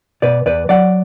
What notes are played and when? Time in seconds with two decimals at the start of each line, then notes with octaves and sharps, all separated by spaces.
0.22 B2 B4 D5
0.46 E2 B4 D5
0.69 F#3 D5 F#5